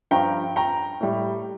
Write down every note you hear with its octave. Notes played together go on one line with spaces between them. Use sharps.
G2 F3 G5 A#5
G5 A#5
A2 G3